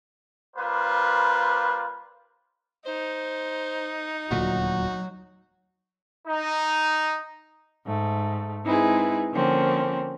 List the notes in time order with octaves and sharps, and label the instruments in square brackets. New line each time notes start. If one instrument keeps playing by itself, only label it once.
[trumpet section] G3 A#3 F4 B4 C5
[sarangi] D#4 [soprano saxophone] C5
[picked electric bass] D#1 D2 A#2 [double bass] F#3 [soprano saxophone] F#4
[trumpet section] D#4
[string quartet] G#2 A3
G#3 C4 D#4 E4 G#4 B4
D3 F3 A#3 C4 C#4